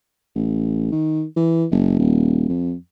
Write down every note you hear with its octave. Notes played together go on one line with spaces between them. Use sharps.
A1
D#3
E3
F#1
D#1
F2